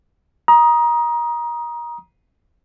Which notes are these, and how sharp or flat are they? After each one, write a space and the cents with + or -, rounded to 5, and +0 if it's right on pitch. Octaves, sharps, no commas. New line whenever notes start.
A#5 +25 D#6 +0